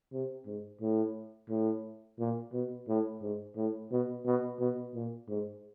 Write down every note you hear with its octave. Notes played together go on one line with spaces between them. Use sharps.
C3
G#2
A2
A2
A#2
B2
A2
G#2
A2
B2
B2
B2
A#2
G#2